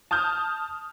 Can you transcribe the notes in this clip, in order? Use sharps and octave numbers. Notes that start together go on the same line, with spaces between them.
A5 D#6 F6 G6